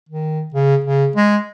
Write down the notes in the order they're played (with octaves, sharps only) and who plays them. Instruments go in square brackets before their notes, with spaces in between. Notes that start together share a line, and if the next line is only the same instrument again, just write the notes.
[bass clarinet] D#3
C#3
C#3
G#3